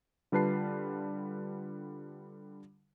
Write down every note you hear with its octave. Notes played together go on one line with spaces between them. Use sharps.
D3 G3 F4 B4 A5 C7